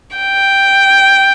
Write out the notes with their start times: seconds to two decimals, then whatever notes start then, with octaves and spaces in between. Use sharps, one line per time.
0.17 G5